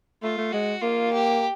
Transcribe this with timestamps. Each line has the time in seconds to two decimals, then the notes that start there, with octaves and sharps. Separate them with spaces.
0.23 A3 F4
0.38 A3
0.52 G#3 F#4
0.82 A#3 F4
1.13 G4